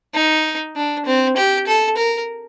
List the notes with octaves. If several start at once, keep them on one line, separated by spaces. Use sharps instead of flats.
D#4
D4
C4
G4
A4
A#4